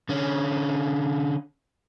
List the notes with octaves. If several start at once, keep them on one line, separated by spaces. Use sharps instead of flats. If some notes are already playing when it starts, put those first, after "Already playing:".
D3 C#4